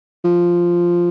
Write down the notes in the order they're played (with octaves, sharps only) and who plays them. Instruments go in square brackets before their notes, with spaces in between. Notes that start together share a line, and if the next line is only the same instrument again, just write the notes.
[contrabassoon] F3